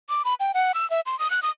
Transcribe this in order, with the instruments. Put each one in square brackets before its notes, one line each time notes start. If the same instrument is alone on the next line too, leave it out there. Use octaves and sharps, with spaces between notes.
[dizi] D6
B5
G5
F#5
E6
E5
C6
D#6
F#6
D#6